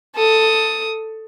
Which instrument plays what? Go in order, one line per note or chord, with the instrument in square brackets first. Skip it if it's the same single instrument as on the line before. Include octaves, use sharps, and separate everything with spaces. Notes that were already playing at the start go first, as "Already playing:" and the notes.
[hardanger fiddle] A4 D#6